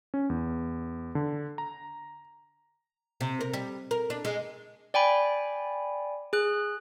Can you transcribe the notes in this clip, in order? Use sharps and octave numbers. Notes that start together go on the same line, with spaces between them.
C#4
E2
D3
A#5
C3
A#4
G3
A#4
D4
G#3
D5 G5 G#5 B5
G#4 F#6